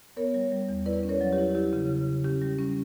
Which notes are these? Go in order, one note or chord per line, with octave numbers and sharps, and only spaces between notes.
B3 A#4 C#5
G3
G3
E2
E4 B4 D5
C#4
A#4 C#5
F#3
G4 B4
E4
E4 G4
C#3
C#3
C#3
C#4 G4
G3
C#4